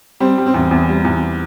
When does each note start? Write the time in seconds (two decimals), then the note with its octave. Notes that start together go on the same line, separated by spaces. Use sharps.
0.20 G3 C4
0.38 G3
0.46 C4
0.54 E2
0.71 E2
0.89 G3
1.05 E2